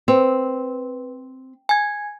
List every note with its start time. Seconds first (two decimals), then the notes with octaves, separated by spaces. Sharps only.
0.08 C4 B4
1.69 G#5 G#6